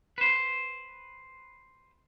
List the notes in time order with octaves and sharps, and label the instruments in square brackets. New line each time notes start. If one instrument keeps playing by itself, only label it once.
[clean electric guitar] B4 C5